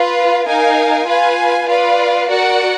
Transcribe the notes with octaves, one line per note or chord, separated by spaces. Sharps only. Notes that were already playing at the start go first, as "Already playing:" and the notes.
Already playing: F4 B4 F5
D#4 A#4 F5 G#5
F4 B4 F5 G#5
F4 B4 D5 F5
F#4 A#4 D5 F#5